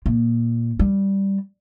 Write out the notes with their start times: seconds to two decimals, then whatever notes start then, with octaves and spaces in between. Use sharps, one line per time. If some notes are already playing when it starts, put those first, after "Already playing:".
0.06 A#2
0.79 G3